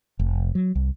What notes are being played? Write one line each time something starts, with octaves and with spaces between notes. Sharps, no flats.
F1
F#3
C2